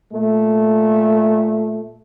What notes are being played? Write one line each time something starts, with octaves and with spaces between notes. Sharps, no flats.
A#2 A3